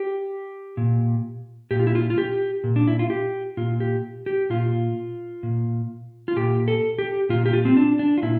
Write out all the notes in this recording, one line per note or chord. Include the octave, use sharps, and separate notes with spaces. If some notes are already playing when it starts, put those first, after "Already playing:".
Already playing: G4
A#2
A#2 G4
F4
E4
F4
F4
G4
A#2
D4
E4
F4
G4
A#2 F4
G4
G4
A#2 F4
A#2
F4
A#2 G4
A4
G4
A#2 F4
G4
F4
C4
D4
D4
F4
A#2 E4